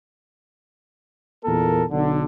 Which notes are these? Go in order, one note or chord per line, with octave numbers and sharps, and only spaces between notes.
E2 A#2 A#3 A4 A#4
B1 D3